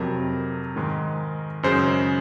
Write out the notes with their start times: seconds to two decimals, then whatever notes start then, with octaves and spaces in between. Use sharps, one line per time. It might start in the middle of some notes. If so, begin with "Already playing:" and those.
Already playing: F2 C3 F#3 A#4
0.76 G#2 D#3 G#3
1.63 F#2 C#3 G#3 C5